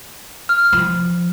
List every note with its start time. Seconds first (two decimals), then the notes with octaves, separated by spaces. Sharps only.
0.49 F6
0.73 F3